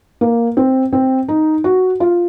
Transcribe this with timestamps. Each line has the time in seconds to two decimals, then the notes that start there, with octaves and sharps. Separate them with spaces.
0.21 A#3
0.57 C4
0.93 C4
1.28 D#4
1.64 F#4
2.00 F4